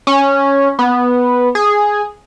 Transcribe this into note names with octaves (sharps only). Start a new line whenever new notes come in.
C#4
B3
G#4